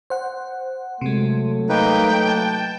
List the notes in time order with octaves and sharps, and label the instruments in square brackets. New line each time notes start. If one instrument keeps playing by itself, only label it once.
[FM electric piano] C5 F#5
[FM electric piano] C3 G#3 [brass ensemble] F#3 A3
[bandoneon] A#3 D#4 B4 [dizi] G5
[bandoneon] A5